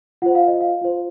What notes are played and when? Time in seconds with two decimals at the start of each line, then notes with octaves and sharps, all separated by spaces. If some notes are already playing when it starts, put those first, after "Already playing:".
0.22 F4 C5 F#5
0.35 F5
0.48 D#5
0.61 F5
0.82 F4 C5